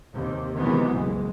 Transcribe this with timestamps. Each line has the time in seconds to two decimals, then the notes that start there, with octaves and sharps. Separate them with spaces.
0.12 D#2 C3
0.56 C3 D#3 E3 F#3 G#3 B3
0.90 F#1 C2 G#3